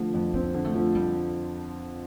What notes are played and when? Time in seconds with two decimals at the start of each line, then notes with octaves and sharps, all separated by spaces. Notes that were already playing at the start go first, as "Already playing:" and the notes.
Already playing: D3 F3 A3
0.14 F2
0.34 A#3 C4
0.54 D3
0.64 A3
0.75 F3
0.95 G3